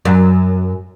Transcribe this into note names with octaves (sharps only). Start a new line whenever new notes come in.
F#2